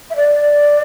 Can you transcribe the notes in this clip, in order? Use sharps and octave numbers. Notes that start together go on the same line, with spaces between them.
E5
D5